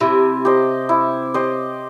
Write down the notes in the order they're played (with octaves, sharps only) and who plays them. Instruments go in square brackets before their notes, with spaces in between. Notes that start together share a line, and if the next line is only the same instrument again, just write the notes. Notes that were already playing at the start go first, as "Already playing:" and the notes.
[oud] C3 [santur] E4
[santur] G4 C5 D#5
E4
G4 C5 D#5